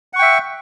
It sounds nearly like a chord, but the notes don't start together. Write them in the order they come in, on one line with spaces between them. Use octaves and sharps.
F#5 C#6 G5 E5